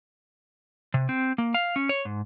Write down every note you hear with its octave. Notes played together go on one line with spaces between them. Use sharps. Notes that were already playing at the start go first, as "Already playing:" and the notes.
C3
C4
A#3
F5
C#4
C#5
G#2